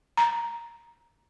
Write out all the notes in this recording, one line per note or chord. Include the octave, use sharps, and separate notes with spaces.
A#5